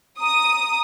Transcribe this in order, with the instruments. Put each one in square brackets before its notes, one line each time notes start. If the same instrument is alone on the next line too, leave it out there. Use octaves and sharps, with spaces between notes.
[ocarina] A#5 [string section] D#6